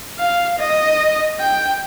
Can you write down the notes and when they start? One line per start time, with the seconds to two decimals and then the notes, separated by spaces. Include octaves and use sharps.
0.19 F5
0.59 D#5
1.40 G5